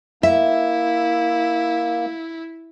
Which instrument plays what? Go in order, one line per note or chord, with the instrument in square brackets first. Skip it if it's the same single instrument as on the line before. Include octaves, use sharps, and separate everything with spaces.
[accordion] A#3 [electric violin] E4 [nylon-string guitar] E5